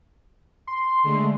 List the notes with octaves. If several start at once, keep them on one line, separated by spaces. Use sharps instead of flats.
C6
D3 G#3 A3